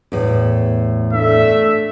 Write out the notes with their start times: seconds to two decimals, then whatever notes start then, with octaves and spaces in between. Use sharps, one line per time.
0.12 E2 A2
1.13 A3 D4 E5